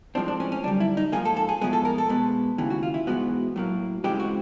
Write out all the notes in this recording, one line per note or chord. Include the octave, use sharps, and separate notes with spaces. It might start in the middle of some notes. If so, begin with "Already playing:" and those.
A2 F3 G#3 C4 D4
D4
C#4
C#4
F#2 D3 G3 D4
E4
D#4
G#2 F3 A#3 G#4
A4
A4
G#4
A2 F3 G#3 B3 G#4
A4
A#4
A4
B2 G#3 B3
D#2 C#3 E3
F#4
F4
E4
G#2 E3 G#3 B3 F#4
A2 F#3 A#3
C#2 C#3 E3 G#3 C4 G4
F#4